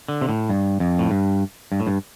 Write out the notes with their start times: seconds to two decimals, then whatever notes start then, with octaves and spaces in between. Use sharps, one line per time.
0.08 D3
0.21 C3
0.29 A2
0.50 G2
0.80 F2
0.99 A2
1.11 G2
1.72 G2
1.80 A2
1.87 G2